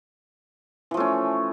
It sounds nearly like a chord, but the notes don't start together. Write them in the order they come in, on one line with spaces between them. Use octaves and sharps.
E3 F3 A3 C#4